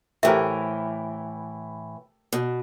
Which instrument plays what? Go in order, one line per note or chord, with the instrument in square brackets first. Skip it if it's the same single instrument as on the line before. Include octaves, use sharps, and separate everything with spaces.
[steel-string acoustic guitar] A2 E3 [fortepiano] A3 G4 A#4 [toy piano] C5 E5
[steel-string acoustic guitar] B2